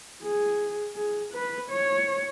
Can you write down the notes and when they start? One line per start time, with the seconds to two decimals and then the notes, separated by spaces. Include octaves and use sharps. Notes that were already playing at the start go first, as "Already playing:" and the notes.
0.23 G#4
0.96 G#4
1.33 B4
1.70 C#5